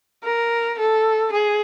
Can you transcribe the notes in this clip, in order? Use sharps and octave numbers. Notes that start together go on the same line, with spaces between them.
A#4
A4
G#4